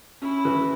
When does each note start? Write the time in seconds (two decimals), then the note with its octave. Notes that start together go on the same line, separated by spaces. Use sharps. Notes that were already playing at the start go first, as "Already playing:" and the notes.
0.22 C#4 E4
0.45 E3